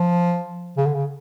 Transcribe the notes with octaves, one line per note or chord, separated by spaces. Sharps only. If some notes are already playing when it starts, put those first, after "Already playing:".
Already playing: F3
C#3
D3
C#3